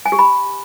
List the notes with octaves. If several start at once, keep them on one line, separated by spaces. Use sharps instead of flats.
G#5
G4
B5